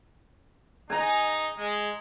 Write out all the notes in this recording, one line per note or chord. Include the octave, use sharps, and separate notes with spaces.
D#4 G#5 A#5
G#3